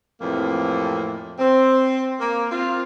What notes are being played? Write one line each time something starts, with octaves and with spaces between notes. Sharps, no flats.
F2 A2 C3 E3 A#3
C4
A#3
C4 F4